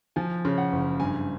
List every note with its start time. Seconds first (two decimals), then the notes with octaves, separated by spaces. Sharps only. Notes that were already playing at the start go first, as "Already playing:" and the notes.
0.16 F3 G#5
0.45 C#3
0.58 F#5
0.72 F#1
1.00 G2 G#5